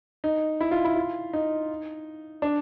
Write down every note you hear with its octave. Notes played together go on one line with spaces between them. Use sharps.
D#4
E4
F4
E4
F4
D#4
D4